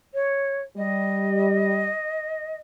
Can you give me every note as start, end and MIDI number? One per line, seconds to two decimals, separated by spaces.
0.13 0.61 73
0.77 1.89 55
0.77 2.56 75